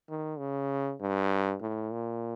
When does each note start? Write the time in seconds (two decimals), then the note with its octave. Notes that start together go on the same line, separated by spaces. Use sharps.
0.09 D#3
0.39 C#3
1.01 G2
1.62 A2
1.93 A#2